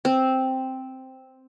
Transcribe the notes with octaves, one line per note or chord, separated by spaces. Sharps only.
C4